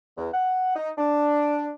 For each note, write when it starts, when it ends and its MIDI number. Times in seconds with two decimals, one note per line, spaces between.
0.17 0.27 40
0.32 0.73 78
0.75 0.89 63
0.97 1.71 62